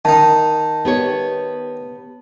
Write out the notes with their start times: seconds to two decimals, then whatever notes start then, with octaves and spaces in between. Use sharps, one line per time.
0.05 D#3 D#4 A5
0.85 B3 G4 C#5